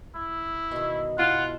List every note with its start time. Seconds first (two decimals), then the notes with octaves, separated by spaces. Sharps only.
0.16 E4
0.71 B2 D#3
1.18 B2 E4 F4 F#5